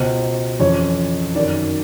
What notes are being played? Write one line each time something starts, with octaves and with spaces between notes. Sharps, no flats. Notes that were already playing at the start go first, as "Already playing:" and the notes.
Already playing: C#2 B2 C5
F2 C#3 E3 C#5
F#2 D#3 D5